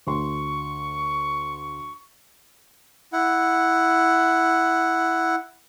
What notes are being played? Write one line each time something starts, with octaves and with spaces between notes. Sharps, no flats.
D2 C6 C#6
E4 F#5